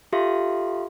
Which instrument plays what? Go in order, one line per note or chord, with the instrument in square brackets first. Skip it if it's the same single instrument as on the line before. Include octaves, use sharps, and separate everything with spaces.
[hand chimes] F4 G4 A4 E5 F5 C6